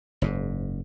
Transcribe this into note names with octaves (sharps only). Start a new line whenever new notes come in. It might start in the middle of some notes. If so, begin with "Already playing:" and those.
F#1 G#2